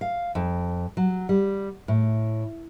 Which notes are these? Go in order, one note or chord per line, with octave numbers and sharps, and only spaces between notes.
F5
F2
F#3
G3
A2